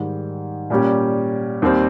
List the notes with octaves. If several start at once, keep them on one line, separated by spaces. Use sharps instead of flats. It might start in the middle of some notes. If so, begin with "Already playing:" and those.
Already playing: G#2 D#3 G3
A#2 G3 C#4 G4
D#2 D#3 G3 C4